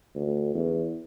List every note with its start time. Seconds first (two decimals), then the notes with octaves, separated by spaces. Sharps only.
0.15 D2
0.54 E2